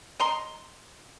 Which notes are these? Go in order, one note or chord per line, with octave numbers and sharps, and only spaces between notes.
D#5 A#5 C6